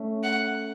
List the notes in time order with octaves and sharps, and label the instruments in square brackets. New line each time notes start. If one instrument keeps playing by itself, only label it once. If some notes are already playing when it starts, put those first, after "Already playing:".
Already playing: [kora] A3 C#4
[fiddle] F#5